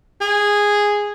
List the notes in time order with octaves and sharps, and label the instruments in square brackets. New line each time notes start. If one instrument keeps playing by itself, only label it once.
[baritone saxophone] G#4